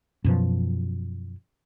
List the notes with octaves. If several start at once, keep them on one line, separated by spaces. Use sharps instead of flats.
F#2 B2 F3